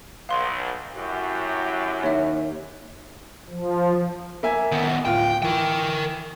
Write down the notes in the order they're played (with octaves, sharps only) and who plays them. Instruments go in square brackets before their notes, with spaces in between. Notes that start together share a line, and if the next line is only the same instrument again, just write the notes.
[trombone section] B1 [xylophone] F5 C6
[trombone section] F#2 [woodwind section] E4 F#4 G4
[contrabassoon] D#2 [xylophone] C#5 E5
[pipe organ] F3
[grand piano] A#3 E5 G#5
[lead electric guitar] D#3 B3
[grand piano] D1 F4 [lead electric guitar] G5
[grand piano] E3 [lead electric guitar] A#4 G5